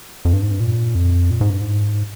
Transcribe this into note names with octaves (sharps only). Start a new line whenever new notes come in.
F2
G2
G#2
G2
A#2
F2
A#2
G#2
G2
G#2